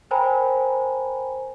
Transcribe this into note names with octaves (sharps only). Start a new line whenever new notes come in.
A#4 C5 G5 G#5 A#5 B5